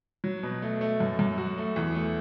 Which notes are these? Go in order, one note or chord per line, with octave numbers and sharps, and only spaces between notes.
F#3
B2
A3
A3
F#2
F#2
F#4
A3
E2
A3